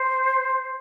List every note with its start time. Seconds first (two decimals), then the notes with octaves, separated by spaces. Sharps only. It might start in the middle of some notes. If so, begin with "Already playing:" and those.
Already playing: C5